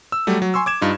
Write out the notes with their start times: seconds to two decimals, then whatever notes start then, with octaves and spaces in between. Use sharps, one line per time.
0.12 E6
0.27 F#3 G3 A3
0.42 F#3
0.54 G#5 C6 C#6 E6
0.66 D6 G#6 E7
0.81 G2 D#4 F4